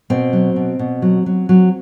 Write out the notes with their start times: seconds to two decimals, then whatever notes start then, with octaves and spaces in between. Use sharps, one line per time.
0.10 B2 C4
0.33 F#3
0.56 B2
0.79 B2
1.02 F#3
1.26 F#3
1.49 F#3